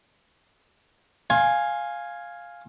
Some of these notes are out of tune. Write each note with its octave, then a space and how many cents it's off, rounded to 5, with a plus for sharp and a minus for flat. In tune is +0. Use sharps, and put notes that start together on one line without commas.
F5 +0 G#5 +0 C6 +30